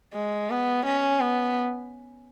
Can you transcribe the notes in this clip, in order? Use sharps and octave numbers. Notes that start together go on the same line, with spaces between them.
G#3
B3
C#4
B3